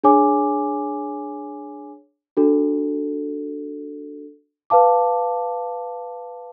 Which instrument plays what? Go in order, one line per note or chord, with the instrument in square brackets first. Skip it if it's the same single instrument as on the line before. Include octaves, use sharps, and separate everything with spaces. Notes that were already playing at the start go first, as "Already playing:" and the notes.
[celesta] D4 G#4 C#5 G#5 D6
D4 F#4 A4
B4 F5 A5 D6